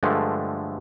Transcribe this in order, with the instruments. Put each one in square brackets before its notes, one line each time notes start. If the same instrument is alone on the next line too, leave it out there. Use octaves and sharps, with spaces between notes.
[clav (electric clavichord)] G2 D3 F3 G#3 A3